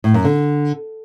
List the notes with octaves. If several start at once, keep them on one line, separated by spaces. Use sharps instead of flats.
A2
F#2
D3